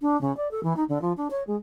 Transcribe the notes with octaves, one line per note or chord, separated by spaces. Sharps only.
D4
C#3
D5
A4
E3
D#4
D3
F3
D4
C#5
G#3